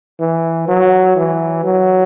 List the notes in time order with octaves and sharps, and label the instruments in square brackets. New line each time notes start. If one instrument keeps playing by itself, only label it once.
[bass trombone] E3
F#3
E3
F#3